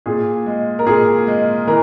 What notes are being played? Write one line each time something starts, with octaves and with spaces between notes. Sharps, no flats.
A#2 G#4
G#3
A#4
A#2 G#4
G#3
E3 A#4